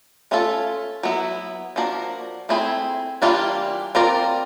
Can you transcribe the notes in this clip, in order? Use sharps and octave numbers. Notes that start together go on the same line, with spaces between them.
A3 C#4 F4 A4
F#3 B3 E4
F3 A#3 D4 F#4 A#4
A3 C4 E4 G#4
E3 G3 A#3 D4 F4
C4 F4 A#4 D5